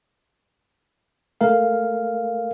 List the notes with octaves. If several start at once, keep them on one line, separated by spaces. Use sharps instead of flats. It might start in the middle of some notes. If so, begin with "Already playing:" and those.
A3 A#4 F5